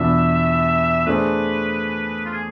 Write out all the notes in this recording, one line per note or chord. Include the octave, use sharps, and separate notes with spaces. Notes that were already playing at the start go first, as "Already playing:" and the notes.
Already playing: E2 B2 B3 D4 F4 E5
A3 D4 G#4 B4 C5
F4
G#4